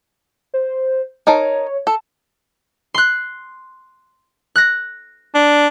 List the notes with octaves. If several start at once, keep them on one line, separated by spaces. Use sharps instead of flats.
C5
D#4 A#4 C#5 A5
A4 A5
C6 F#6
F#6 A#6
D4